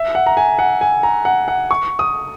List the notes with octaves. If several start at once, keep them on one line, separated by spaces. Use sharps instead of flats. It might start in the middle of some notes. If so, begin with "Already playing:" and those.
Already playing: E5
F#5
A#5
G#5
F#5
G#5
A#5
F#5
F#5
C#6
D#6